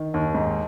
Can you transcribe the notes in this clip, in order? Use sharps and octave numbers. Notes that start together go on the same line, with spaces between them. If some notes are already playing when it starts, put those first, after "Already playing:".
Already playing: D#3
D#2
G#2